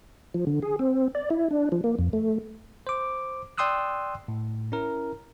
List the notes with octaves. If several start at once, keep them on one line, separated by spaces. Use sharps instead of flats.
F3
D3
G#4
C4
D5
E4
D4
F3
A#3
F2
A3
C5 D6
D5 G5 C6 D#6 E6 F#6
A2
C#4 E4 A#4